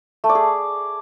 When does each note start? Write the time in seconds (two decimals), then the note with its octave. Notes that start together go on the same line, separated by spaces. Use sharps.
0.24 A3
0.29 D5
0.35 G#4